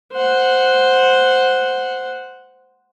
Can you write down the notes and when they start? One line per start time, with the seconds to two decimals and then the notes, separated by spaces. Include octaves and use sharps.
0.13 C5 F#5